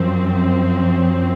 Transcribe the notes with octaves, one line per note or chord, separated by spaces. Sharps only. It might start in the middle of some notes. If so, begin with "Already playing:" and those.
Already playing: F#2 F3 C4